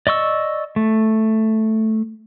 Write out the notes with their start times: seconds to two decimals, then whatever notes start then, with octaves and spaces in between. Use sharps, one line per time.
0.07 D5 D#5 C#6 E6
0.76 A3